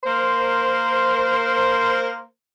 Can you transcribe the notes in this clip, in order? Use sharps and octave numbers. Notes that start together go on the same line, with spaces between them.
A#3 A#4 C5